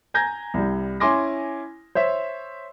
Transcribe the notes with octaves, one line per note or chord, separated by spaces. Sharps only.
G#5 A#5 G6 G#6 A#6
C2 G3
C#4 E4 G#5 C6 D6 A#6
C5 C#5 E5